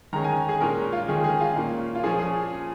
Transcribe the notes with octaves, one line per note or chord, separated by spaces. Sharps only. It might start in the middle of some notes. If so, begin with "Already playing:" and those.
D#3 G#3 C#4 A#5
G#5
G#4
A#2 G#3 C#4 A#4
F4
D#3 G#3 C#4 G#4
G#4
F4
A#2 A#3 C#4
F4
A#2 F3 C#4 G#4
G#4